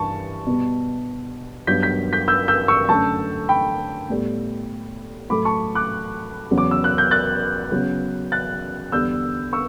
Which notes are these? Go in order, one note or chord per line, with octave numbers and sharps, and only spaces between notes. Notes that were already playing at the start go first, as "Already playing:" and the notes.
Already playing: G2 E3 A5 C#6
B2 G3 B3
G2 F#3 B3 G6 B6
G6 B6
G6 B6
E6 G6
E6 G6
C#6 E6
F#2 D3 A3 A5 C#6
G5 B5
A2 G3 B3
A2 F#3 A3 B5 D6
A5 C#6
D6 F#6
E2 C#3 F#3 B3
D6
E6
F#6
G6
F#6 A6
C#3 F#3 B3
F#6 A6
E2 D3 G3 B3 E6 G6
C#6 E6